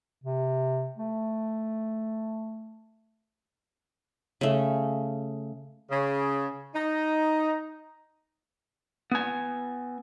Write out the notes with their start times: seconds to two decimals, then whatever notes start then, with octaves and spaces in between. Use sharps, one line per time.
0.24 C3
0.98 A3
4.41 C#3 A3
5.90 C#3
6.75 D#4
9.12 B3 G#5